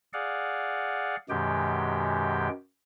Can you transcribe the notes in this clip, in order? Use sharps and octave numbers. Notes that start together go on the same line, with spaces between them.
G#4 D5 F5 F#5
F#2 B2 D#3 G#3 G4 G5